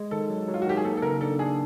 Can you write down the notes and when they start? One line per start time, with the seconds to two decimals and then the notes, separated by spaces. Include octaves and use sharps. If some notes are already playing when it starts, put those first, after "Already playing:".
Already playing: G#3
0.11 D#3 A4
0.30 F#3
0.48 F#3
0.54 F4
0.62 F#4
0.66 D#3 G4
0.77 G#4
0.84 A#3 A4
0.97 A4
1.02 C#3 A#4
1.21 D4 A4
1.39 D4 G#4